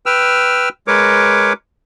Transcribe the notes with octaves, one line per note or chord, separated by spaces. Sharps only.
B4 G5 E6 F6
G#3 A#4 B4 C#5 D6